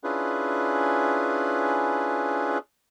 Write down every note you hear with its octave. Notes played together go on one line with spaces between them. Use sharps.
C#4 D4 E4 F4 G#4 B4